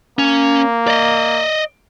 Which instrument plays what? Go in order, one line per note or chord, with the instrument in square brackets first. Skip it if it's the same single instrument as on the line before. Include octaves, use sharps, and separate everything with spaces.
[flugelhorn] A#3 [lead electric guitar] C#4
[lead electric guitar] D5 D#5